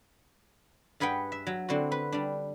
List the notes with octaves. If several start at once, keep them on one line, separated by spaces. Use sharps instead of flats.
G2 G#4 B4 F#5 G5
E5
F#3
D3 C4 E4 F#4
B4
G3 D4